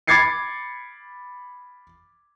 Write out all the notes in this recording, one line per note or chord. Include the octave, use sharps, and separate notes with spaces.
B5 D6 G#6 A6 C7 C#7